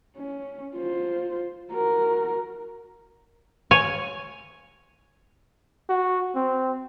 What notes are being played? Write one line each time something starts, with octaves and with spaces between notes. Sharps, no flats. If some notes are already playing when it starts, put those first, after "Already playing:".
C#4
F4 C5
F#4 A#4
C#5 G#5
F#4
C4